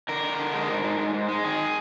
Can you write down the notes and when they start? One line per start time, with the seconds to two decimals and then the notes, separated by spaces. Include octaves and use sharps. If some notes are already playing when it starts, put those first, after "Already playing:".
0.09 D3 A#4
0.23 D3
0.39 D3
0.54 G#3
0.69 G#2
0.84 G#2
0.99 G#2
1.14 G#2
1.29 G#3
1.44 D#3 G#4